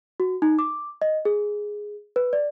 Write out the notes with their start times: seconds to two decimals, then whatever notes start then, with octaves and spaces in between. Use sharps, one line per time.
0.20 F#4
0.42 D#4
0.59 D6
1.02 D#5
1.25 G#4
2.16 B4
2.33 D5